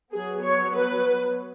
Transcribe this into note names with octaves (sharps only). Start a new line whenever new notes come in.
F#3 B3 G#4
C#5
B4